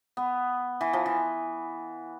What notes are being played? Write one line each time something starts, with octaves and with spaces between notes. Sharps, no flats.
B3
E3
F3
E3